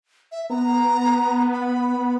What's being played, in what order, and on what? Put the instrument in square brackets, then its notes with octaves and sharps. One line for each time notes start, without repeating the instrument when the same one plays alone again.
[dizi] E5
[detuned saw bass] B3 [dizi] A#5
[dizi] B5